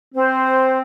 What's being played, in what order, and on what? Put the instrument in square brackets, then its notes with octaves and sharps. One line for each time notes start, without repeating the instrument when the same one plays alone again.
[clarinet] C4 [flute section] C5